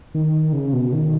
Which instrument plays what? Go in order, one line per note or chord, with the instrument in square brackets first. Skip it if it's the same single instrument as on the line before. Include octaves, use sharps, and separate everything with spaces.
[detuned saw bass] D#3
C#3
B2
D#3